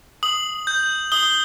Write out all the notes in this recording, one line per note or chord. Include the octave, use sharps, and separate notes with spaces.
D#6 F#7
G6
D#6 G7